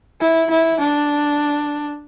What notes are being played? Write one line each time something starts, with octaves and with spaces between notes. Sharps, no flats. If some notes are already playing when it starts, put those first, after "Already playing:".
E4
E4
D4